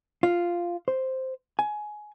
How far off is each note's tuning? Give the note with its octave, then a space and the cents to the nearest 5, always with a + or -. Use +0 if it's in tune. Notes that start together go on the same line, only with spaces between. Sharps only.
F4 -5
C5 +0
G#5 +20